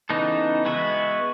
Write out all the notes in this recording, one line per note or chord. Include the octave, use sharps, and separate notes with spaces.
C#3 E3 B3 D#4 A4
G#3 B3 F#4 B4 E5